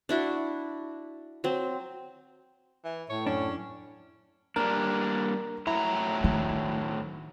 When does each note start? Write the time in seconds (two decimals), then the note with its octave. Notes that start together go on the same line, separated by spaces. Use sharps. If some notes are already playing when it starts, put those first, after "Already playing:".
0.09 D4 E4 F#4
1.44 F#3 C4
2.84 E3
3.09 A2 C#5
3.27 F#2 C#4 D4
4.56 G3 A#3 D4 A#4
5.67 A2 F#3 E4 A#5
6.24 D#3